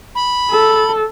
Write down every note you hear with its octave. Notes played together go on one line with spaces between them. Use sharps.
B5
A4